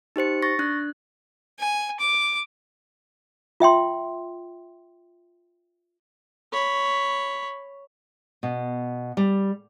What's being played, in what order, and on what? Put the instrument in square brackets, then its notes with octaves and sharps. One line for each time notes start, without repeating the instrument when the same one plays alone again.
[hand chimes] D#4 G4 C5 C#7
C#6 A6 A#6
D4 F#6
[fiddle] G#5
D6
[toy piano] F4 E5 G5 C6
[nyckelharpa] C#5 B5
[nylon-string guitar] B2
G3